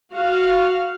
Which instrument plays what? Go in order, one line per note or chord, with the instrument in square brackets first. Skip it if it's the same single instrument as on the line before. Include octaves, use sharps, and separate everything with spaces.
[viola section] F#4 F5